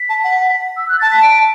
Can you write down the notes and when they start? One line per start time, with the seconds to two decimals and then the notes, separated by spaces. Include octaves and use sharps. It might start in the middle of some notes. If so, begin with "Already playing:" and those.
Already playing: B6
0.09 A5
0.24 F#5
0.77 E6
0.89 F#6
0.99 A5 A6
1.11 B6
1.22 D7